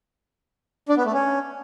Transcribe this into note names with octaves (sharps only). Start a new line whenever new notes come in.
D4
B3
A3
C#4